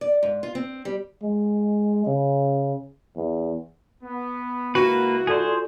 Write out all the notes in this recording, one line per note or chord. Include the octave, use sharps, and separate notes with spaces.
D5
G#2
F4
C4
G3
G#3
C#3
E2
B3
C#2 A#3 E4 F#4 B4 F#5
F4 G#4 A4 C5 D5